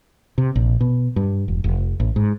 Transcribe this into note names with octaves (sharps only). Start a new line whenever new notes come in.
C3
A#1
B2
G2
E1
F1
A1
G#2